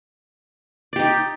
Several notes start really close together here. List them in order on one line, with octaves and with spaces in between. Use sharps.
D5 G4 D#4